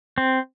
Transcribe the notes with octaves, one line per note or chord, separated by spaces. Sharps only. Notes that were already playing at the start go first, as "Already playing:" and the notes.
C4